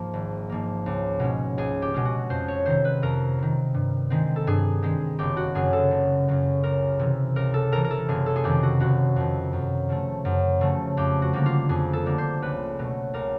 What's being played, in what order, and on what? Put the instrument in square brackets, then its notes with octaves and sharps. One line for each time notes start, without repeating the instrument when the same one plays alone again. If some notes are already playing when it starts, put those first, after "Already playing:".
Already playing: [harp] G#2 F3 A#3
G#1
G#2 F3 A#3
C#2
B2 G#3 C#4
C#2 G#4
G4
B2 G#3 C#4
F#4
F2 C5
C#5
C3 D#3 C5
B4
F2 A#4
C3 D#3
G2
D#3 G#3 C4
A4
G2 G#4
D#3 G#3 C4
F#1 G4
F#4
F#2 C#3 F#3 G#4
A4
F#1
F#2 C#3 F#3
C#2 A#4
C3 E3
C#2 A#4
A4
C3 E3 A#4
A#4
A4
F#1 G#4
A4
G#4
F2 C3 D#3 G4
F#4
F#1 F#4
F2 C3 D#3
F#2
C#3 F3 A3
F#2
C#3 F3 A3
F2 G4
F#4
D3 G3 A#3
F4
F2 G#4
A4
D3 G3 A#3
C5
C#2 B4
B2 F#3 A3
C#2 A#4